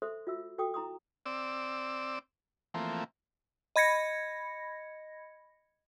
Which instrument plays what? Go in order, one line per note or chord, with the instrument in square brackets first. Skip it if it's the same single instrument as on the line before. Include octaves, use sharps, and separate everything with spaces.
[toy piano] A4 C5 E5 C6 D#6
F4 F#4 E5 E6
F#4 A4 G5 D6 D#6
E4 A#5 C6 D#6
[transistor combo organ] C4 D5 E6
E3 F3 A3 A#3 C4
[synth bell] D#5 B5 G#6 A#6 C#7